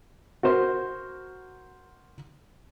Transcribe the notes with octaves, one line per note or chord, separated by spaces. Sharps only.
F#4 A#4 C5